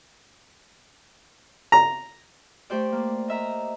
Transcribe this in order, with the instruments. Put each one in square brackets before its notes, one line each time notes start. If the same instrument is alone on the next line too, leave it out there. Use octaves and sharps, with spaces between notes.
[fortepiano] A#5
[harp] A3 G4 C5 D5
A#3
D#5 E5 A#5